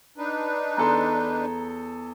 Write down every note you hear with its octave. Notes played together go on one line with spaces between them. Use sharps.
D4 D#4 B4
E2 A4 A#5 C6